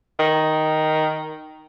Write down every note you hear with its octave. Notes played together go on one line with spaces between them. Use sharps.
D#3